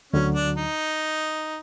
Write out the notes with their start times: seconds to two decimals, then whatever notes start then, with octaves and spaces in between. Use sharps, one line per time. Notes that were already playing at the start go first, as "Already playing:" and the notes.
0.12 D2 D3 F#3 C#4
0.35 D4
0.55 D#4